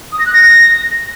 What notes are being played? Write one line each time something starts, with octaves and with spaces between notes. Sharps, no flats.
D#6
A#6
F#6
A#6